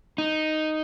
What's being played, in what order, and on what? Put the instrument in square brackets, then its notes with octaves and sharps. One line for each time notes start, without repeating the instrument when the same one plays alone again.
[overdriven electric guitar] D#4